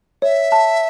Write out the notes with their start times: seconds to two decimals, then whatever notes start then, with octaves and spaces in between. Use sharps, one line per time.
0.22 C#5 E5
0.52 A5